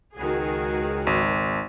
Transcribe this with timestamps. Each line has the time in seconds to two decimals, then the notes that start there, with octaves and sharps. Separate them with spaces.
0.16 C#2 D#3 F#4 G#4
1.07 G#1